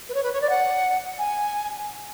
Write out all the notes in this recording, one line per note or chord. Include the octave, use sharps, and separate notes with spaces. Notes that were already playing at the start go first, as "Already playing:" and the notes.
B4
C#5
B4
C#5
D5
F#5
G#5